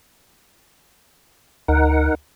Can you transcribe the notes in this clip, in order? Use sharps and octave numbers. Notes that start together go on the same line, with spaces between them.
D2 D#4 A#4 F#5